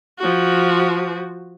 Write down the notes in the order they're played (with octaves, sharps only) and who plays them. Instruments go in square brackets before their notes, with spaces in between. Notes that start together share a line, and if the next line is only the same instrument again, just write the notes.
[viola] F3 F#4